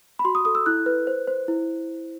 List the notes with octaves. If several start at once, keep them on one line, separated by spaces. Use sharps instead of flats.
B5
F#4 C6
D#6
A4 D#6
E6
E4 F#6
B4
C5
C5
E4